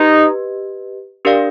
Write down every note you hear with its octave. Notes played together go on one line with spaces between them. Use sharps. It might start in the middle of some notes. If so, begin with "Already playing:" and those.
Already playing: D#4 G4 B4 D#5
D4 G4 A#4 D5 F5